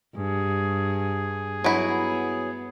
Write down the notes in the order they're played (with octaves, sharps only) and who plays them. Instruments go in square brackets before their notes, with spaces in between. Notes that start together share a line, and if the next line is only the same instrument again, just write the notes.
[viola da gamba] G2 [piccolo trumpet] G#4
[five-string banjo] F#3 E4 [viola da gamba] B3